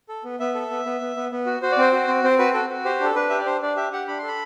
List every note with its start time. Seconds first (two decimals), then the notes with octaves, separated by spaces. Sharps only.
0.09 A4
0.24 B3
0.39 B3 E5
0.55 A4
0.71 B3
0.85 B3
1.01 B3
1.16 B3
1.32 B3
1.46 F#4
1.62 F#4 C5
1.72 D5
1.78 C4 C5
1.93 F#4
2.08 C4
2.24 C4 C5
2.39 F#4 B4
2.54 F#4 A4
2.70 F#4
2.85 G4 C5
3.00 D4 A4
3.15 D4 B4
3.30 G4 E5
3.38 D5
3.46 D4 C5
3.62 D4 D5
3.77 G4 E5
3.93 G4 F#5
4.08 D4 B5
4.18 A4 C6
4.28 B5